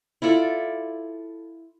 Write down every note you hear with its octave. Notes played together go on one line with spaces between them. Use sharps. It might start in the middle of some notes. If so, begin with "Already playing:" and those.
E4 F4 A4 D5